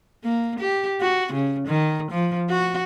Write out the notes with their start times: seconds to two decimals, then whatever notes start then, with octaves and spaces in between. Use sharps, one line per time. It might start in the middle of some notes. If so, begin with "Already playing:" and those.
0.24 A#3
0.59 G4
1.01 F#4
1.33 C#3
1.68 D#3
2.11 F3
2.50 F#4